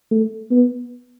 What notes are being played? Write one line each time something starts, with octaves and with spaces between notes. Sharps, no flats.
A3
B3